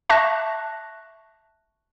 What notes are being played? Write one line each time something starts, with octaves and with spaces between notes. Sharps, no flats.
E5 A5 C#6 F#6 A#6